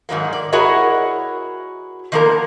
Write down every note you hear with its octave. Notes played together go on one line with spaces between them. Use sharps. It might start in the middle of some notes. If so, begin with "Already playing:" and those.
G#2 D#3 F#3 A#3
D5
E4 F#4 G#4 A#4 C#5 D#5
D#3 F3 A#3 B3 A#4